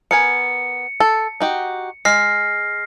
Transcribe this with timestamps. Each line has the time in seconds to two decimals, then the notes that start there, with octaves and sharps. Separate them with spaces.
0.11 B3 A#4 G#5 C#7
1.00 A4
1.40 D#4 F#4 G4
2.05 G#3 F6 A#6 C7